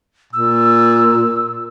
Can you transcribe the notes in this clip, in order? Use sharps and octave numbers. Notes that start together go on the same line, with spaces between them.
A#2 E6